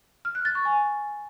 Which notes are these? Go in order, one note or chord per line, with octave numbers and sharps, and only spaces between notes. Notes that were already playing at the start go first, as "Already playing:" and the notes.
F6
F#6
A6
C#6
G#5